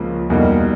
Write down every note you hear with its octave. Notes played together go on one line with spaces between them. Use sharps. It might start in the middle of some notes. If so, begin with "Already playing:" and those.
Already playing: C#2 C#3 F3 A#3
E2 B2 G3 A#3 D#4